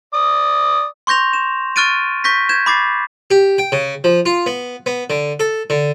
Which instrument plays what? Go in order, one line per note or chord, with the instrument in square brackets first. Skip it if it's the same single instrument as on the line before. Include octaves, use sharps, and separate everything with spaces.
[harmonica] D5 D#6
[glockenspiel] C6 C#6 G6 A#6 F7
E7
C#6 F6 F#6 A6 D7 D#7
C#6 G6 A#6 B6
G6 G#6 E7
B5 D6 A6 C7
[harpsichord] G4
G5
C#3
F3
F4
B3
B3
D3
A4
D3